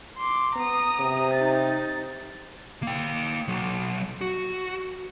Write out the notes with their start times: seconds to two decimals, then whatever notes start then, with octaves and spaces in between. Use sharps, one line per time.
0.18 C6 D6
0.56 B3 A#5 D#6
1.00 C3
1.34 D#4 A6
2.83 A#3 G5
3.48 B1 F#3
4.21 F#4